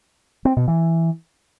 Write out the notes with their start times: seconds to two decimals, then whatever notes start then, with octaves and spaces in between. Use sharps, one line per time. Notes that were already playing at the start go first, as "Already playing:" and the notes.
0.45 C4
0.56 B2
0.68 E3